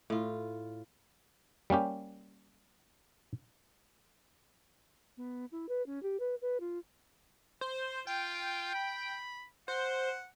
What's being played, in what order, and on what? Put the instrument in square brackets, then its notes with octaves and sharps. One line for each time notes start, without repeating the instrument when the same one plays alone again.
[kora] A2 F4
[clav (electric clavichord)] G3 A#3 C#4 G4
[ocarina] B3
E4
B4
C#4
G4
B4
B4
F4
[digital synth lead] C5
[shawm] F4 [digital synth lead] G5
[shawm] B5
[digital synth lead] C5 [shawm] F#5